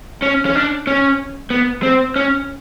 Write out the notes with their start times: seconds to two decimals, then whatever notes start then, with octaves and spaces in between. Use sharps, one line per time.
0.22 C#4
0.45 C#4
0.55 D4
0.87 C#4
1.50 B3
1.83 C4
2.16 C#4